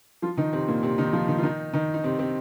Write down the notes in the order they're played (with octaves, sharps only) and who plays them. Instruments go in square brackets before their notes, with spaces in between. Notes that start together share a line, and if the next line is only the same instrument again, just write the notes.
[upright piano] F3 F4
D#3 D#4
C3 C4
A#2 A#3
C3 C4
D#3 D#4
F3 F4
D#3 D#4
F4
D#3 D#4
D#3 D#4
D#4
C3 C4
C3 C4